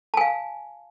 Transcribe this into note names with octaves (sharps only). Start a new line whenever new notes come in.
F5 G#5 A5